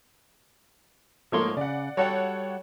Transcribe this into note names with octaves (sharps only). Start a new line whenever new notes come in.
G#2 F3 A3 A#3 C#5 C6
C#3 D5 F#5
G3 F#4 A4 C#5 F#5 G5